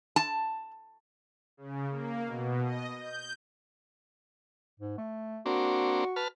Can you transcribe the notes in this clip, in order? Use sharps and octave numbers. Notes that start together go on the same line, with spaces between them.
A5
C#3
A#3
B2
D#5
G6
G#2
A3
A#3 C4 D4 F#4
B4 A5 F6